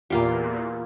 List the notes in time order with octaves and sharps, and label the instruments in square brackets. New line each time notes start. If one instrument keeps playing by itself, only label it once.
[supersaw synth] E2 A#2 [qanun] A#3 F4 G4